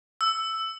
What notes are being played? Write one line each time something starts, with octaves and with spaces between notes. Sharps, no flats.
E6